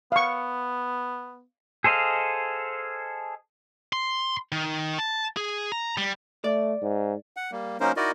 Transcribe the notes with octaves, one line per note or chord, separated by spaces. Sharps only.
B3 F5 C#6
G#4 A4 C5 D#5 F5
C6
D#3
A5
G#4
A#5
G3
A3 D5
G#2
F#5
G3 A#3
F#3 A#3 C#4 D#4 A#4 C5
D#4 E4 F#4 A#4 D5 D#5